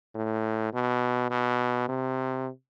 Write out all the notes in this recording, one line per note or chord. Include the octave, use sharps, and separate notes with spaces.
A2
B2
B2
C3